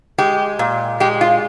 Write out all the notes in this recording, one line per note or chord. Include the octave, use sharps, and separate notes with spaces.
G#3 G4
A#2
G#3 G4
F4